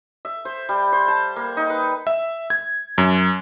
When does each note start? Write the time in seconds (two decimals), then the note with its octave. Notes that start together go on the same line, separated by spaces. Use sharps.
0.25 E5
0.45 C5
0.69 G3
0.92 C5
1.08 A5
1.36 A#3
1.57 D#4
1.70 B4
2.07 E5
2.50 G#6
2.98 F#2